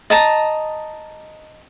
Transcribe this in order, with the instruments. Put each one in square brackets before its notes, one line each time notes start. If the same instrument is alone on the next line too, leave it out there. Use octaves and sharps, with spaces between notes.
[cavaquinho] D#5 A5 A#5